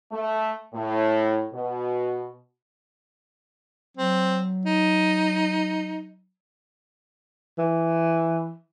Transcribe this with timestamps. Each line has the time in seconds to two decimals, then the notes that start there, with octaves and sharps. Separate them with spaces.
0.12 A3
0.74 A2
1.53 B2
3.97 F#3 C4
4.65 D#4
7.58 E3